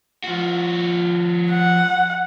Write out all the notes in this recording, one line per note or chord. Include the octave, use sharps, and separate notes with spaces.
F3 F#4
F#5